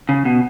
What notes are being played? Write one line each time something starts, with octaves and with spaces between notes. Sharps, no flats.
C#3
B2